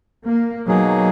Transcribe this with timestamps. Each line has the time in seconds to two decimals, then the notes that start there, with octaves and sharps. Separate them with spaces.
0.25 A#3
0.67 B2 F#3 A#3 D#4 G#4